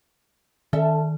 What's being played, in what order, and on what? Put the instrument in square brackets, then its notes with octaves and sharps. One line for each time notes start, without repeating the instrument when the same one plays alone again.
[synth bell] D#3 [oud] A4 E5